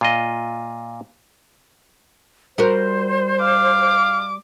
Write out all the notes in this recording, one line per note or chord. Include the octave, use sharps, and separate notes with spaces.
A#2 F4 D#5
G3 F#4 A#4 C5
F5 D6